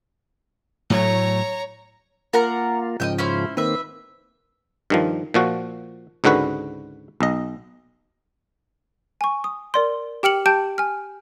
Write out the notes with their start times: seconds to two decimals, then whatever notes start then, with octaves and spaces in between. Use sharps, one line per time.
0.90 A2 F#3 A3 C#5 A#5
2.33 A#3 F4 A#4 F#5 A#5
3.00 G#2 C#3 F3 D#5 E5 G5
3.18 C#4 E4 C5
3.57 D#3 A#3 C4 B4 E5
4.90 G2 D#3 F3
5.34 A#2 F3 F#4
6.24 C#2 G#2 D3 F#4 B4
7.20 B1 D#5
9.21 G#5 C#6
9.44 D#6
9.74 A#4 D5 C6
10.23 G4 G5 F6 C#7 F#7
10.46 G4 G5 A5 G6 D7
10.78 G#5 F6